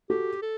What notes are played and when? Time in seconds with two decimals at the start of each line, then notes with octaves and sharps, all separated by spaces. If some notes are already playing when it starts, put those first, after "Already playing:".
0.10 F#4 G4 A4
0.42 A4